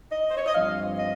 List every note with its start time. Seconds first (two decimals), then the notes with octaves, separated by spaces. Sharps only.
0.12 D#5
0.29 C5
0.37 C#5
0.47 D#5
0.54 G2 F3 C4 F5
0.96 D#5